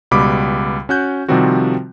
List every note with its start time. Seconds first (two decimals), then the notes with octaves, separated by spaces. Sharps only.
0.11 C#2 B2 G3 B5 D6
0.89 C#4 F#4 F#6 G6
1.29 C3 D#3 F3 G3 C4 F#4